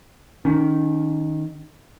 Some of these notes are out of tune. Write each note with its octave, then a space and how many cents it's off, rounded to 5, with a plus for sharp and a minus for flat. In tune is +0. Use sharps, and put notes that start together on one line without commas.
D#3 +0 C#4 +30